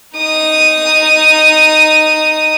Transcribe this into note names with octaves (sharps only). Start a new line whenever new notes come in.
D#4 D#6